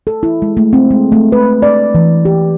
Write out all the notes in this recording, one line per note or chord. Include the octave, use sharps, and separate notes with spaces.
A4
E4
G#3
A3
C4
G#3
A3
B4
D5
E3
G4